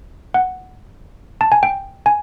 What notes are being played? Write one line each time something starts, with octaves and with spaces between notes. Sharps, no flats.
F#5
A5
G#5
G5
G#5